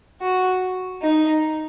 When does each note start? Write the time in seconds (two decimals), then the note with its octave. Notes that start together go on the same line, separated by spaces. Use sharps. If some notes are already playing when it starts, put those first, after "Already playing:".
0.21 F#4
1.03 D#4